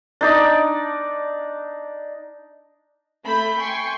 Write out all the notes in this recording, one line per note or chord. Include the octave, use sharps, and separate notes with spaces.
D4 D#4 D5
A3 B5 G6
G5 G#5 C6 C#6